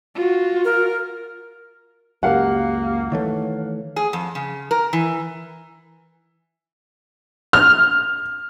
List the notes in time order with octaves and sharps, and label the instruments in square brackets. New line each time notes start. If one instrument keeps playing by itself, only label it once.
[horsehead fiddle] F4 F#4
[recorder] A#4
[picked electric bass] C#2 F#2 [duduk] A#3 [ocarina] G4 [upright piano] A#4 F5 F#5
[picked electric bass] D#3 E3 A3 [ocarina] C#5
[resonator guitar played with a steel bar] G#4
F2
C#3
A#4
E3
[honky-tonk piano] F6